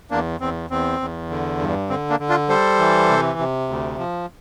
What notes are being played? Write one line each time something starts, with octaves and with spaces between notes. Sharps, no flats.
E2 A#3 D4
E2 C4
E2 C4
E2
D3
G2
D3 C4
A#3 D4
D3
D4 F4
G3 A4 C5
E3
C3
C3
D2
F3